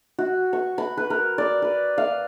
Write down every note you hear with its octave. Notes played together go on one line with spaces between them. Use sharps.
F#4
C#6
B5
B4
A#4
D5
B4
F5